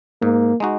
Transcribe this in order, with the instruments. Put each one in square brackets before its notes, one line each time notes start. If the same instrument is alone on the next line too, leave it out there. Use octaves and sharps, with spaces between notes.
[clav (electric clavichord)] G#2 [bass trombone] A#3
[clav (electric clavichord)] G#3 D#4 F#4